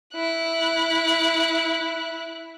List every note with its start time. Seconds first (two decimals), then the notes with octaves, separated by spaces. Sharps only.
0.14 E4 F#6